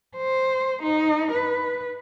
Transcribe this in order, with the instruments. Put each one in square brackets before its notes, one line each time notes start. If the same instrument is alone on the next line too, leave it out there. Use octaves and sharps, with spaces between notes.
[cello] C5
D#4
B4